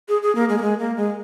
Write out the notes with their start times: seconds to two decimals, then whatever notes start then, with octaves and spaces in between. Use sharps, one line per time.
0.09 G#4
0.23 G#4
0.35 A#3
0.49 G#3
0.58 A#3
0.62 G#3
0.79 A#3
0.97 G#3